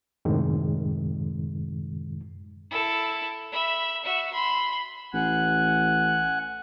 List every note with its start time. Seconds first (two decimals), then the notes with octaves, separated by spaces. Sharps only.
0.25 F#2 A2 C3 D#3 G#3
2.70 E4 A4
3.52 E5 B5
4.04 F#4 E5
4.34 B5 C6
5.13 A1 F#5 G#5 F#6